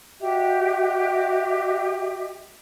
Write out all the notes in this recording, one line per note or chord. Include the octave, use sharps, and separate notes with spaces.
F#4 G4 D#5 E5